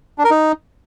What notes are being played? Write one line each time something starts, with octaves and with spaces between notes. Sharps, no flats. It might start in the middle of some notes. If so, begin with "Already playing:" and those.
D4
A#4
D#4